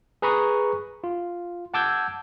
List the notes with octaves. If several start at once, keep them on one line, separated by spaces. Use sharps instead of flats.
G#4 B4 A#5 B5 C#6 D#6
F4
F#5 A5 D6 E6 G6 G#6